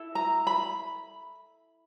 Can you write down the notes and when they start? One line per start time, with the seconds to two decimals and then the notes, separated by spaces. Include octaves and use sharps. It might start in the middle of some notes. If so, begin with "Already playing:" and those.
Already playing: E4 A4
0.15 A#5
0.47 B5